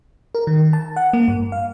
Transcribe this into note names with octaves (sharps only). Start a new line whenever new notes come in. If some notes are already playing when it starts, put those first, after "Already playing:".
A#4
D#3
A5
F#5
A#3
G2
F5